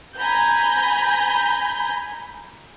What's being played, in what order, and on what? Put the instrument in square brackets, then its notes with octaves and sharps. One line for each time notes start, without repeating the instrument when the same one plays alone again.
[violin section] G#5 A#5 B5 G6